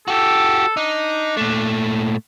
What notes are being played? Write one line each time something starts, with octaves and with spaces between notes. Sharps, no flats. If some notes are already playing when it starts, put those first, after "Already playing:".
F#4 G4 A4
D4 D#4
A#2 A3